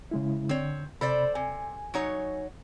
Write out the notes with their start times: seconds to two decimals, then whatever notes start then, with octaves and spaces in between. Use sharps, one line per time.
0.11 C#3 G#3 E4
0.49 D3 C4 C#5
1.01 C3 A4 C5 D5 B5
1.35 C3 G#5
1.94 F#3 D#4 C#5